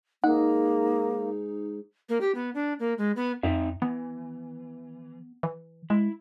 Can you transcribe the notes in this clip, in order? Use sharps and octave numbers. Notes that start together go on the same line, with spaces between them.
G#2 A#3 D#4 G#4 F#5
A#3
G4
B3
D4
A#3
G#3
B3
F2 C4 D#4 E5
E3 B3
E3
G#3 E4